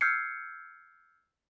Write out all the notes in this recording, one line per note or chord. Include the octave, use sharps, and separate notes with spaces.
E6 F6 G6 G#6 C7 C#7